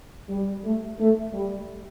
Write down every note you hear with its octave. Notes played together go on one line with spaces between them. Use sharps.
G3
A3
A3
G3